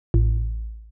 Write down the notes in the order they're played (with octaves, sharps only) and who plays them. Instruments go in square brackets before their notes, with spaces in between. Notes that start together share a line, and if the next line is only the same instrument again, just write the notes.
[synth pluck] A1